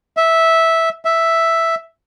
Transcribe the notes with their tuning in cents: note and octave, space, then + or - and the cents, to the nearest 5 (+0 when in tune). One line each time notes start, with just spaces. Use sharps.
E5 -10
E5 +0